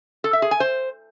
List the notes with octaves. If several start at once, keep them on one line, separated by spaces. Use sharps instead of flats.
A4
E5
G#4
G#5
C5